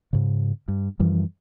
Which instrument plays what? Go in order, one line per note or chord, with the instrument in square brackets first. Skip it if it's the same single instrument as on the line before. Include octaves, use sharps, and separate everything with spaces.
[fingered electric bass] G#2 C#3
G2
F#2 E3 F3 G3